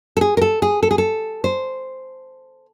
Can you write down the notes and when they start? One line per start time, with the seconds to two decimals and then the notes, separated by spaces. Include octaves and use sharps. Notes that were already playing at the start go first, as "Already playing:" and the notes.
0.17 A4
0.21 G#4
0.37 A#4
0.42 A4
0.62 G#4
0.83 A4
0.91 G#4
0.98 A4
1.44 C5